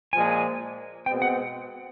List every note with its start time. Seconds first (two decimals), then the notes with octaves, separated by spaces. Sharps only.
0.13 A#2 F3 G#3 G#5
1.06 B2 G#3 C4 G5
1.22 F#5